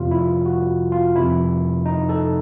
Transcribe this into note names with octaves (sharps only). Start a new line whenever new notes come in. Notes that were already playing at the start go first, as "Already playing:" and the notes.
Already playing: F2 C3 F3 F4
E4
F#4
F4
F2 C3 F3 E4
D#4
A4